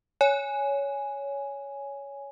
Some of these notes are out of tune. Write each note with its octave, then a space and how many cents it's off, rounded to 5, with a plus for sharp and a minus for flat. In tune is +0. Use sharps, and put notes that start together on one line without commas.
C#5 +15 G#5 +0